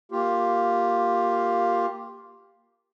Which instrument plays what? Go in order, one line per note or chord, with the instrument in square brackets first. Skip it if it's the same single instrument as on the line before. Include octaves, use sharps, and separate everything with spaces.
[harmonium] A#3 F4 G4